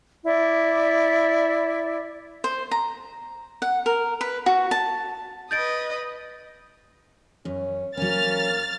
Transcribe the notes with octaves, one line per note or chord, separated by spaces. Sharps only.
E4 D5
C5
A#5
F#5
A#4
B4
F#4
A5
B4 D#5 G6 A6 D7
F#2 C#4
F#3 A#3 C#4 F6 A6